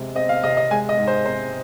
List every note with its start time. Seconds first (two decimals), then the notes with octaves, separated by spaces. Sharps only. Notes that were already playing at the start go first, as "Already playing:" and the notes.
Already playing: C3 G#3
0.15 C4 D#5
0.29 F5
0.44 C3 D#5
0.57 D#5
0.71 G#3 G#5
0.89 D#5
0.98 G#2
1.07 C5
1.25 C4 C5